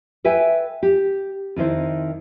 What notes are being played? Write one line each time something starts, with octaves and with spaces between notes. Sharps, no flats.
A4 B4 E5 G5 G#5
G4
F2 D#3 E4 C5